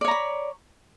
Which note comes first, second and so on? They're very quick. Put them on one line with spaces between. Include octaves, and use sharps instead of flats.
D5 C#5 A#5 B5